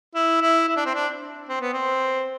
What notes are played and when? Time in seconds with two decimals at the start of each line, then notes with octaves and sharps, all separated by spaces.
0.15 E4
0.41 E4
0.68 E4
0.77 D4
0.86 C4
0.95 D4
1.49 C4
1.61 B3
1.73 C4